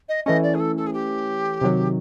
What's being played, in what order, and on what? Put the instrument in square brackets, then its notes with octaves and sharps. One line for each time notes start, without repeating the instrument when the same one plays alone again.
[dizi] D#5
[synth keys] E3 A3 C#4 [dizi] D#5
[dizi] D5
G#4
A4
A4
G#4
G4
[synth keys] C3 D#3 F#3